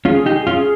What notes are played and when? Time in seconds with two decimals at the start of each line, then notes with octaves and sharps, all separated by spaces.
0.05 C#4 F4 G#4
0.26 D#4 G4
0.47 C#4 F4 G#4